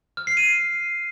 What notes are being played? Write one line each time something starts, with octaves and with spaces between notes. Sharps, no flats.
F6
C7
D#7